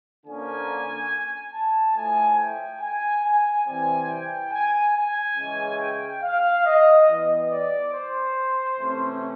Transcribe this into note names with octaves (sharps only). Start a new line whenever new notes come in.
D3 F3 A#3 C#4 G#5
A5
A2 F3 A3 G#5
G5
G#5
G#5
C3 E3 G3 C4 G#5
G5
G#5
G#5
C#3 E3 G#3 C#4
G5
F5
D#5
E3 G3 B3 D#5
D5
C5
C3 E3 A3 C#4